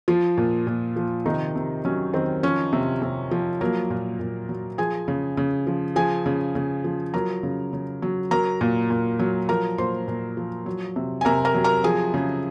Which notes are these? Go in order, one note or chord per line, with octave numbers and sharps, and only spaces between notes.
F3 F4
A#2
A#2
F3
C3 D#3 D#4
C3
F#3 C#4
D#3 C4
F3 C#4
C3
C3
F3
F#3 A#3 A#4
A#2
A#2
F#3
F3 G#4 G#5
C#3
C#3
F3
F3 G#4 G#5
C#3
C#3
F3
F#3 A#4 A#5
C#3
C#3
F#3
F#3 A#4 A#5
A#2
A#2
F#3
F3 A#4 A#5
A#2 C5 C6
A#2
F3
F#3
C3
G#5
C3 A#4 A#5
A#4 A#5
F#3
A#4 A#5
F3 G#4 G#5
C#3